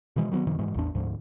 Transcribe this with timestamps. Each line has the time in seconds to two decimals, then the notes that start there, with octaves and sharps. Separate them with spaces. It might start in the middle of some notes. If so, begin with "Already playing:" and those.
0.16 B2 D#3 E3 G#3
0.32 D#3 F#3 A#3 B3
0.47 F#2 C3 D#3 F3
0.59 G#2 E3 G#3
0.74 A1 E2 D4
0.95 D2 G#2 F3